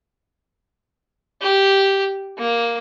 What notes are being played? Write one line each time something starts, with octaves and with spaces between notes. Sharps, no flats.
G4
A#3